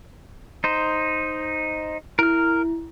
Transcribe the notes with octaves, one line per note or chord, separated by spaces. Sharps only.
D#4 C5
E4 A#4 F6